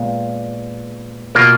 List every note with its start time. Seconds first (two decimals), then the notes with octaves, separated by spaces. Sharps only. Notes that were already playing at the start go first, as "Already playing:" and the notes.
Already playing: A#2 G#3 B3
1.35 B2 A#3 F4 A#4